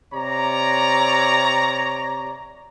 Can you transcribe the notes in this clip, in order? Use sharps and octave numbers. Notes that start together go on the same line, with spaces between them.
C3 C#5 D5 A#5